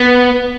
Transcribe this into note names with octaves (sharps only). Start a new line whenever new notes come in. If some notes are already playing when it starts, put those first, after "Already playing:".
Already playing: B3